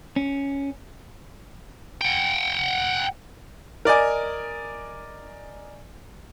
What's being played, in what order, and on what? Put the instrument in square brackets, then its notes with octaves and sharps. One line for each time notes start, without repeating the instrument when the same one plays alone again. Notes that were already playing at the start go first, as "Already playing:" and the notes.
[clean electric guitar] C#4
[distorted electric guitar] F#5 G5
[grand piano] A#4 D5 D#5 G#5